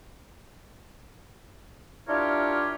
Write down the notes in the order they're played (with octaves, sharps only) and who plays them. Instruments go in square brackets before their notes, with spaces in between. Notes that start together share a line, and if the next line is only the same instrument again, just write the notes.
[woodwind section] D4 E4 F4 G4 A#4 C#5